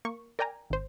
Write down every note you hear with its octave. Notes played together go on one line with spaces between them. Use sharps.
A#3 C#6
A#4 D5 G5 G#5 A#5
G#1 C5